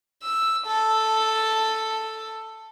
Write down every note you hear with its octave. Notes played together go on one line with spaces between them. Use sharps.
E6
A4